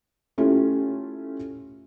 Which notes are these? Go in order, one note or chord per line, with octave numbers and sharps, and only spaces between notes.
A3 C#4 E4 F4 G4